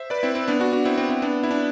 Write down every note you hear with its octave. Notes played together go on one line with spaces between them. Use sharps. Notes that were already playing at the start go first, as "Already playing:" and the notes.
Already playing: C5 E5
B4 D5
C4 E4
C4
B3 D4
D4 F#4
D4 F#4
C4 E4
C4
C4 E4
B3 D4
E4
D4